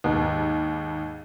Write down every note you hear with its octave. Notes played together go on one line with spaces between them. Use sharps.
D#2 G#2